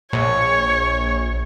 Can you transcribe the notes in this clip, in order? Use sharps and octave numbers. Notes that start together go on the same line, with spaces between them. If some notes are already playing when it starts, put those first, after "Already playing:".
A#1 C#5